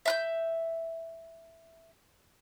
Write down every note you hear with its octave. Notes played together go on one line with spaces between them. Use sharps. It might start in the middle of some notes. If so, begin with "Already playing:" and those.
E5 F#6 G6